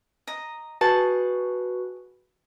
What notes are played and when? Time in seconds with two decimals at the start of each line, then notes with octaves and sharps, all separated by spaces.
0.27 D#5 A#5
0.81 F#4 G#4 B4 F#5 A5